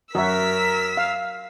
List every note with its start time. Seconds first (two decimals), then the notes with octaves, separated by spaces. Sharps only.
0.15 F#2 F#4 A#4 C#5 E5 E6 B6
0.97 F5